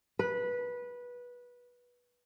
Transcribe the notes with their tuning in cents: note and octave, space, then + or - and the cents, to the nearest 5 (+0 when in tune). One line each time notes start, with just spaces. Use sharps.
B4 -15